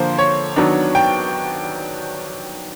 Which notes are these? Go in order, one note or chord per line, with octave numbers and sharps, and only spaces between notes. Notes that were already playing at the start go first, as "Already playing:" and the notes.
Already playing: D3 F3 A#3 C5
C#5
D#3 F#3 B3 D4
G5